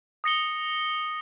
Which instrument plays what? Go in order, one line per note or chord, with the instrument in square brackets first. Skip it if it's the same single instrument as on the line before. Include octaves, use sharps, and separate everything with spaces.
[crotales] D#6 A#6 C#7 G7